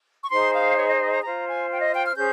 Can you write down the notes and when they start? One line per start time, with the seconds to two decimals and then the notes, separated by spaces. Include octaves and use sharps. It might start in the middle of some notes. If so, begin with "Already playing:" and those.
0.24 C#6
0.30 D#4 G#4 C5 C6
0.54 F5
0.77 C#5
0.89 D#5
1.01 D#5
1.12 A#5
1.24 F4 C5 A#5
1.46 G#5
1.71 G5
1.81 D#5
1.94 G5
2.05 F6
2.16 C#4 G#4 C5 G6